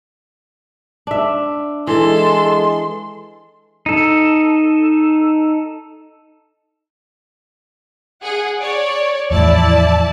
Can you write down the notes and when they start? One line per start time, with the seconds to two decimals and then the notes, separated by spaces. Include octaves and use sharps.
1.07 D4 E5
1.87 E3 G#3 A4 C6
3.86 D#4 A4
8.22 G#4 F#5
8.60 C#5 D5
9.31 E2 A2 F3 E4 D5 A5